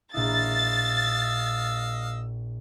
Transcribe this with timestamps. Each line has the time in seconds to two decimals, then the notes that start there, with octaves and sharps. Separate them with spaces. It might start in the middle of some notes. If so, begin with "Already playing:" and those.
0.14 A#1 E4 D#5 F5 E6 A6